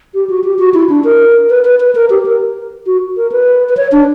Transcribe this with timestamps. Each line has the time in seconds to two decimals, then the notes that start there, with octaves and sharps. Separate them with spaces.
0.14 G4
0.29 F#4
0.44 G4
0.59 F#4
0.74 E4
0.89 D4
1.04 A#4
1.50 B4
1.65 B4
1.80 B4
1.95 A#4
2.10 G4
2.26 A#4
2.86 F#4
3.17 A#4
3.32 B4
3.69 B4
3.77 C#5
3.92 D4